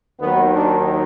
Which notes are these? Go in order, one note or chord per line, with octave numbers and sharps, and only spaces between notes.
D#2 D#3 F#3 B3
D4